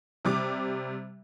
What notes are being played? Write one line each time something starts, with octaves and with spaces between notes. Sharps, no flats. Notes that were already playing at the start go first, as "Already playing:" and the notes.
C3 G3 D6